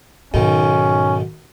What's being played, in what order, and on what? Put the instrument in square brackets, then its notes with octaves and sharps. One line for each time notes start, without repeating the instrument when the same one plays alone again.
[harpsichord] B1 D#3 [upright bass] G#2 [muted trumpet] C#4